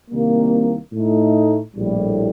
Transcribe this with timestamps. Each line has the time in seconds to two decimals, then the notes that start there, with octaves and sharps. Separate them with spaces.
0.10 C2 C3 D#3 G3 A#3
0.93 A2 A3 D#4
1.76 A#1 A2 G3